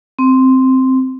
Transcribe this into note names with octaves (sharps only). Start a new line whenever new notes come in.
C4